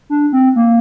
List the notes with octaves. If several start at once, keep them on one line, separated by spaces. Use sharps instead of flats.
D4
C4
A#3